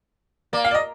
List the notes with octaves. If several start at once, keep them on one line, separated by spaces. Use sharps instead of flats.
A#3 D5
F5
D5
D#5